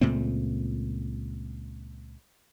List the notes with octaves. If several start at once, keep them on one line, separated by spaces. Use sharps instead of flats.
C#2 A#2 A3 C4